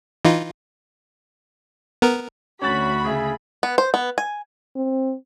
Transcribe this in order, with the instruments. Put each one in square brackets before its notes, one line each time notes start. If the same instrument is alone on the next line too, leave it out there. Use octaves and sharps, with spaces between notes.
[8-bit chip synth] E3 D#4 F4
B3 A#4
[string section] D2 B5 [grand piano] C#4 A6 F#7 [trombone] F#4
[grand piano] C#3 G#4 E5
[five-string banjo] B3
C5
B3
G#5
[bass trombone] C4